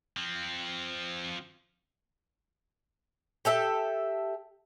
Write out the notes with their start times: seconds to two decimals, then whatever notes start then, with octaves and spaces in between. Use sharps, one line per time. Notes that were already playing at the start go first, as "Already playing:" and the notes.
0.17 F3 C4
3.45 G4 A4 E5